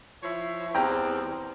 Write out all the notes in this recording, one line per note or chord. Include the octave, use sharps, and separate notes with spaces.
F3 E4 C#5
E2 G3 C4 G5 A#5